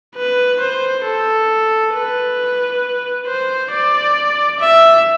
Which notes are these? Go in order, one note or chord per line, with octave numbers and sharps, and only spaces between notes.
B4
C5
A4
B4
C5
D5
E5